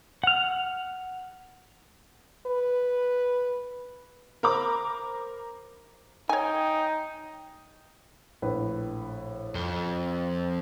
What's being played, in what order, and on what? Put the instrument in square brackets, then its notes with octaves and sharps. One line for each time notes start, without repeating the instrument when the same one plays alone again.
[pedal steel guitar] F#5 F6
[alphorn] B4
[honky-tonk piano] A#4 C5 A#5 B5 D6
[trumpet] D#4 [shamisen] C#5 G#5 [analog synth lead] G5
[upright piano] A#1 A2 B4
[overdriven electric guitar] F2 [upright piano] G7